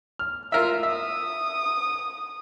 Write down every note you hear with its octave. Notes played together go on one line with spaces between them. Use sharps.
F6
F4 A#4 E5 F5
E5 D#6